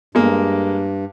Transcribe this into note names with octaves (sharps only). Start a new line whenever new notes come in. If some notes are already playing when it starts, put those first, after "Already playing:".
G2 G#3 A#3